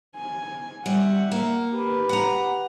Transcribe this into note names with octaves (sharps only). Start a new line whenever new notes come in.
G#5
G3 E5 F#5
A#3
G4 B4
F#5 A#5